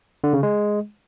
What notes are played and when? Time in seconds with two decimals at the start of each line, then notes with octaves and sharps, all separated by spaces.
0.24 D3
0.33 C#3
0.43 G#3